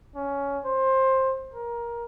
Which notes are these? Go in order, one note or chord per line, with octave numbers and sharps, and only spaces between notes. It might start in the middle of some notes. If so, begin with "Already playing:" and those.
C#4
C5
A#4